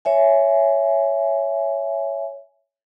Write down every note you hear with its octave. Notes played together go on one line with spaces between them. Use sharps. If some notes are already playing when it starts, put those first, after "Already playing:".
C#5 E5 G#5